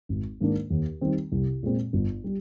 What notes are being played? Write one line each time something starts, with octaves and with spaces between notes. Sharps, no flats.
G#1
G#2 D#3 A#3 D4
D#2
D#3 G3 C4
C2
A#2 G#3 C4
G1
G3